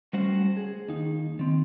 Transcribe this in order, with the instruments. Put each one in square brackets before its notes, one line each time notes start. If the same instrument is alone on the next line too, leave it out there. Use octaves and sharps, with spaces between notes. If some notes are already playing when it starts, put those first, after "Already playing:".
[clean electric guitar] G3 A3 C#4 F#4 C5 F#5
G#4
D#2 D#4
D#3 C4